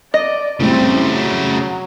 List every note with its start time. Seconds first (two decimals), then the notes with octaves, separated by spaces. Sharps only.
0.14 D5 D#5
0.60 F#2 A2 C#3 G3 A3 C4
1.08 F#3